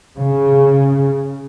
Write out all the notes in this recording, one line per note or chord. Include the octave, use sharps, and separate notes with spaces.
C#3